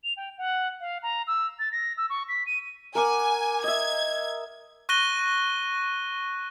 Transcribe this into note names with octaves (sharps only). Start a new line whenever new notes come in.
F7
G5
F#5
F5
A#5
E6
A6
A#6
E6
C#6
B6
D#7
A#4 F#5 G#5 D6
D#5 E5 G#6
C#6 F#6 A#6 D#7 G7